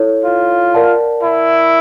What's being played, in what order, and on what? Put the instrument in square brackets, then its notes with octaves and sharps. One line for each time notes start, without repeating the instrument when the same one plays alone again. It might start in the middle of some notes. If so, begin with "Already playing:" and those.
Already playing: [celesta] E4 A4 C#5
[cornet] F4
[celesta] A#4 D5 F#5 A5
[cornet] E4